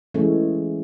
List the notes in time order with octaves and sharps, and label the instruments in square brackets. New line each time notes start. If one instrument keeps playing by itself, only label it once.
[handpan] E3 G#3 A3 C#4